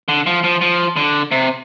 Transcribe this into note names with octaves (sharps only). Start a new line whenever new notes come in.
D3
F3
F3
F3
D3
C3